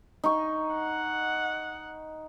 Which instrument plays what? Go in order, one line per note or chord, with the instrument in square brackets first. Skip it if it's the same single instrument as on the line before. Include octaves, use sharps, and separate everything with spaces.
[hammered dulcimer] D#4 C#6
[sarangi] F#5